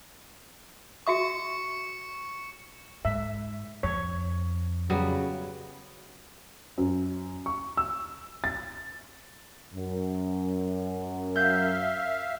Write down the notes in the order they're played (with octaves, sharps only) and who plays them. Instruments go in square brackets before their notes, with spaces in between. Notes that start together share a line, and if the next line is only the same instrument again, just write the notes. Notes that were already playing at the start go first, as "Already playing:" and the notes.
[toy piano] F#4 E5 D#6 [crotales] C#6 C#7
[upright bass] G#2 [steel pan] E5
[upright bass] F2 [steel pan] C#5
[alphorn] C#3 [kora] F#3 G3 B3
[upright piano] F#2
C#6
E6
A6
[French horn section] F#2
[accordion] E5 F5 [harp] G6